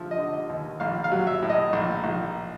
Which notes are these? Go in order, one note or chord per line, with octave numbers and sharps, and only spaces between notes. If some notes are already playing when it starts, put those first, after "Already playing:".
Already playing: D3 F3 E5
D#5
D3
D#5
D#2
A#1 F5
F5
F#3
E5
A2
D#5
A#1
A#1